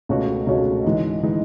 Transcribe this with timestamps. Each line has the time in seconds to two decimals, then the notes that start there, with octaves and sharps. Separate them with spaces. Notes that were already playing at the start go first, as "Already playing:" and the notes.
0.09 C#2 B2 A3 C#4 F#4
0.47 C#2 B2 A3 C#4 F#4
0.84 G#2 E3 G#3 D#4
1.23 E3 G#3 D#4